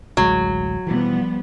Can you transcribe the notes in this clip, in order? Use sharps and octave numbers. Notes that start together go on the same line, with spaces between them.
A1 D2 F#3 G#3
B2 E3 F3 G3 B3